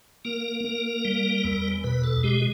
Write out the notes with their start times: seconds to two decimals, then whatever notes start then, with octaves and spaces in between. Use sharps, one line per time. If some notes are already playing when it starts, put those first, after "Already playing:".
0.25 A#3 A#4
0.65 A#3
1.05 G3
1.44 E2
1.84 B2 B4
2.04 A4
2.23 G#3 G4